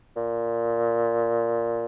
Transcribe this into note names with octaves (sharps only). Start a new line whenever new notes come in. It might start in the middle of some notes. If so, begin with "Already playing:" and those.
A#2